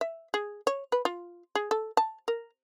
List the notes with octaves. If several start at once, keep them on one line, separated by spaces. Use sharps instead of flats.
E5
G#4
C#5
B4
F4
G#4
A4
A5
A#4